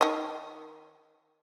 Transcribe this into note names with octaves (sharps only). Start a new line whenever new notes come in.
D#3 D#5